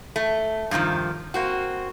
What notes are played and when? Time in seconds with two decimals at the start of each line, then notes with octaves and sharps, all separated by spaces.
0.16 A3
0.71 G2 C3 D#3 F3
1.34 A#3 C4 F#4